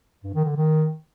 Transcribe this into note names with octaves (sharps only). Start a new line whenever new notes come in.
G2
D#3
D3
D#3